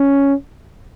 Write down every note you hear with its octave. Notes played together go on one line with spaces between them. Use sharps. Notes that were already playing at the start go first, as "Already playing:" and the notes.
Already playing: C#4